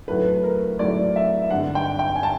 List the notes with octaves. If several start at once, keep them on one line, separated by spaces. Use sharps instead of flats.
A2 F#3 A3 B4
A#4
A2 F#3 A3 D5
E5
G2 D3 G3 F#5
G5
G5
G#5
A5